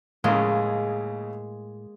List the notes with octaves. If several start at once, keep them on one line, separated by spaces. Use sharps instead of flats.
D#2 A2 C#3 G#3 A#3